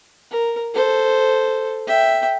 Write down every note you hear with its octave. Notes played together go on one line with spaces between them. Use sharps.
A#4
A4 C5
E5 G5